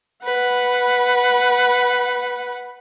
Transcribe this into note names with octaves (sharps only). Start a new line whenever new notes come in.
B4 F#5